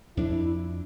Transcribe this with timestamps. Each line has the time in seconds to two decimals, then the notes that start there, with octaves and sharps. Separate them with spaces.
0.17 F2 D4 E4